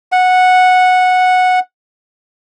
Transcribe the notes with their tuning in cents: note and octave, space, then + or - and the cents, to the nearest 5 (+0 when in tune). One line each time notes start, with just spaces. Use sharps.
F#5 -10